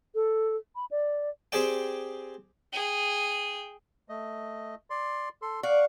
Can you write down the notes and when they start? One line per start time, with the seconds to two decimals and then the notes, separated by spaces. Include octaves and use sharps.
0.15 A4
0.76 B5
0.91 D5
1.52 C4 G4 G#4 D5 G5
2.73 G#4 G5
4.09 A3 D#5
4.90 D5 C6
5.42 A4 C6
5.63 D5 F5 F#5 C#6